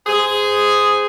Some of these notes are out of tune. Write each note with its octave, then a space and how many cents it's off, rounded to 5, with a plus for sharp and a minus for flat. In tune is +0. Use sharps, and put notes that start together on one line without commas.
G#4 +0 C5 -20